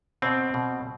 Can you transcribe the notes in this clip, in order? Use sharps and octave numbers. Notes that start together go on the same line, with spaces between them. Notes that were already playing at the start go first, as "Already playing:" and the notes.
B2 C4
B2